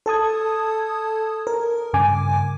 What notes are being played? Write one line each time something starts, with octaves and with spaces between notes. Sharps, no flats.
A4 A5 D#6 G#6
A#4
G2 C#3 G#5 D6